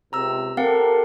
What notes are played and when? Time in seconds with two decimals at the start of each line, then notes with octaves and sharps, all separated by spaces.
0.13 C#2 C3 A#5 E6
0.57 C4 G4 A4 A#4 F5 F#5